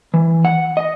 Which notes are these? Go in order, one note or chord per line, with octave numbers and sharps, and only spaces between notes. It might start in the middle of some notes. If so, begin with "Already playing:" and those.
E3
F#5
D#5